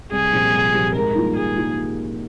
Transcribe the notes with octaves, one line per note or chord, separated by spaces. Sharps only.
C2 G#4
A#2 F3 C4 G4
C2
A#2 F3 C4 G4
G#2 A#4
D#3 G3 A#3 F4
G#2 G#4
D#3 G3 A#3 F4